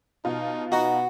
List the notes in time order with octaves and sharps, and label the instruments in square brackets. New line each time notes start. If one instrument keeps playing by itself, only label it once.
[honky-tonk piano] B2 F4 [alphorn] D#4
[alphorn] B3 [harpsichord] D#4 [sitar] F#4